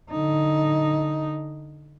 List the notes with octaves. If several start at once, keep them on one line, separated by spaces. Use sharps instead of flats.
D3 D#4